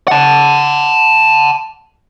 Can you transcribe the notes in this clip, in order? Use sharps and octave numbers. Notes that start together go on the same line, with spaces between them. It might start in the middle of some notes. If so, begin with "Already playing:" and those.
F#5 A5